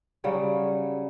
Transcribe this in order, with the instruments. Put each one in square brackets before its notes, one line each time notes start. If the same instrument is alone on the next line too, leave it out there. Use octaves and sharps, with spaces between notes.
[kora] C#3 F#3 G3 C#5